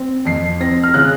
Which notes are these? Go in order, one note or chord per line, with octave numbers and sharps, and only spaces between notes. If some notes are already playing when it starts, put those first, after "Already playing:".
Already playing: C4
F2 C7
C4 A#6
F6
C#3 F#6